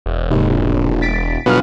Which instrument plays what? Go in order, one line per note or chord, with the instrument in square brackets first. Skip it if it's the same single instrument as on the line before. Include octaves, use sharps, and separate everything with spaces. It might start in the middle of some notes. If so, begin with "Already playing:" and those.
[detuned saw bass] E1
[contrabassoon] D#2 [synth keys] G#2 C3
[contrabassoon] A#1
[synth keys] A6 B6 D7
[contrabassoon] G1 [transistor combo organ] B2 F#3 B3 [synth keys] F5 F6